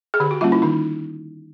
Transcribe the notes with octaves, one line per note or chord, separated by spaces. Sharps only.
G#4
D3 G4
F#4
G3 A#3 C#4 F4
E4
D#3 D#4